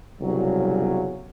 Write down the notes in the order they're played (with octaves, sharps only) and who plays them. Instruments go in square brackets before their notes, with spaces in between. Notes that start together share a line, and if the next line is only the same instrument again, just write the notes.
[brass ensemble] G1 C2 C#3 F#3